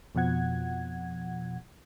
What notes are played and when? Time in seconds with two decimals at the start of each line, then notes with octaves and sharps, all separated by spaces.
0.15 F2 B2 F3 F#5 G#6